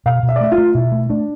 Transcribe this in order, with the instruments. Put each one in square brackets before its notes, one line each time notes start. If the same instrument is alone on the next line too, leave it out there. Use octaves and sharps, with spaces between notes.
[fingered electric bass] B2 [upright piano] F5
[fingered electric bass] B2
[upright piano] E5
D5
[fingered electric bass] A3 [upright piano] E5
[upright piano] F4
[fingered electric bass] A3
[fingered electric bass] B2 [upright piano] E4
[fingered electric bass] A3
[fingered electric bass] A3 [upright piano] D4